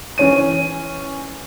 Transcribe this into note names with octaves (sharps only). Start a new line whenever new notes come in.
E3 C#4 C#5 D#7